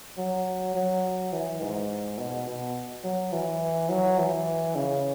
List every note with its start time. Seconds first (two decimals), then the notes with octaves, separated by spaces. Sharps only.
0.17 F#3
0.75 F#3
1.33 E3
1.62 G#2
2.18 B2
2.47 B2
3.04 F#3
3.33 E3
3.89 F#3
4.19 E3
4.75 C#3